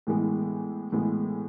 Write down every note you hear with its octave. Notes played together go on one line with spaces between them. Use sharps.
A2 E3 G#3 B3
A2 E3 G#3 B3